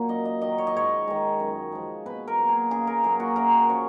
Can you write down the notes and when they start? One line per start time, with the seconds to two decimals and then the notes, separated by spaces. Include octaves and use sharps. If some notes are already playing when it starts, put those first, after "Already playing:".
Already playing: A#2 F#3 A#3
0.08 F#2 D#5
0.25 D#5
0.41 D#3 F#3 D#5
0.58 C#5
0.67 D#5
0.74 G#2 C#5
1.08 D#3 G#3
1.40 F#2
1.72 F3 G#3
2.06 B2 B4
2.28 A#4
2.38 F#3 A#3
2.48 G#4
2.71 C#3 G#4
2.87 A#4
3.04 F#3 A#3 G#4
3.20 F#4
3.36 F#2 A#4
3.69 C#3 F3 C#5